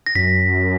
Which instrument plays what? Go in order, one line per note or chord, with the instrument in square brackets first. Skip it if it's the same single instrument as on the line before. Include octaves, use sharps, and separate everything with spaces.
[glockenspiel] A#6
[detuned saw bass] F#2 [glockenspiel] B6